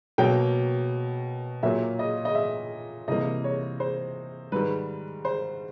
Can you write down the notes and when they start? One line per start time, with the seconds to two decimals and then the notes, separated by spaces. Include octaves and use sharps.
0.18 B2 F#3 A#3 G5
1.63 A#2 F#3 A#3 E5
1.99 D#5
2.25 D#5
2.35 E5
3.08 C3 E3 G3 A#3 D#5
3.44 C#5
3.80 C5
4.52 G#2 D#3 G3 B4
5.25 C5